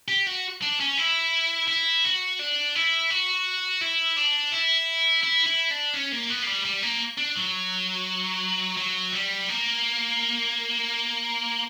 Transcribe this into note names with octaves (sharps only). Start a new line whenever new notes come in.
G4
F#4
D4
C#4
E4
E4
F#4
D4
E4
F#4
E4
D4
E4
E4
E4
D4
C#4
A#3
B3
A#3
G3
G3
A#3
D4
F#3
F#3
G3
A#3